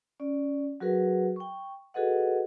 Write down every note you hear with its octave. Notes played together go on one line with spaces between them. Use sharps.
C#4 D5
F#3 F#4 G#4 A#4 B4 F#5
G5 C#6
F#4 G#4 A4 B4 D#5 F#5